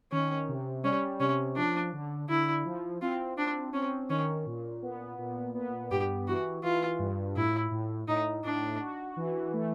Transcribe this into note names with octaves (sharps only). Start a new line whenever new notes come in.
D#3 C#4
C3
G3 C#4
C3 C#4
F3 D4
D3
D3 E4
F3
C4 F4
C4 D4
C4 C#4
D#3 C#4
A#2
B3
A#2
B3
G2 G4
E3 F#4
E3 F4
G2
A2 E4
A2
A2 D#4
A2 D4
F#4
E3
A3